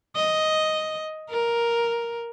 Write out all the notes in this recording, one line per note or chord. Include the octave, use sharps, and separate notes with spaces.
D#5
A#4